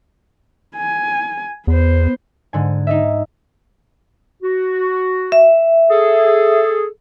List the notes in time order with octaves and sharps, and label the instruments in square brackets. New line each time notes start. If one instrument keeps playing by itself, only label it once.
[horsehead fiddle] G#5
[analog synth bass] E2 [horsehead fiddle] B3 C5
[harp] G#2 D3 G#5
D#4 D#5 E5
[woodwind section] F#4
[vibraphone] E5
[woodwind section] G#4 A4